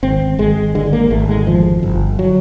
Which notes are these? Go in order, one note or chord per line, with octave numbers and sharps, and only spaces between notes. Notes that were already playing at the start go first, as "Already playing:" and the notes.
G#1 C4
G#1 G#3
D3 G#3
A#3
G#1 A3
G#3
F2 F3
G1
F#3